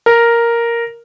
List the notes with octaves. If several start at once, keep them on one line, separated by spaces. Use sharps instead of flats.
A#4